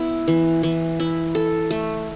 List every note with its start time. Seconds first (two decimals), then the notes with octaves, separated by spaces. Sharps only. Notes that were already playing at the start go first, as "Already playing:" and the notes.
Already playing: B3 E4
0.28 E3
0.63 E3
1.00 E4
1.35 A4
1.71 A3